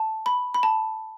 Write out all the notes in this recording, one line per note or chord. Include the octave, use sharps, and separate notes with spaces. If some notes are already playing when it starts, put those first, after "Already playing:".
Already playing: A5
B5
B5
A5